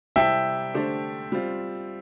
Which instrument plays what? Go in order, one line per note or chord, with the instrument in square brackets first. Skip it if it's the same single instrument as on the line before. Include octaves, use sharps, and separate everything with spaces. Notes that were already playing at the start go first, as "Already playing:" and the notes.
[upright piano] C3 G3 C4 E4 A4 [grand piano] E5 G5
[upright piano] D3 A3 D4 G4 C5
G3 C4 F4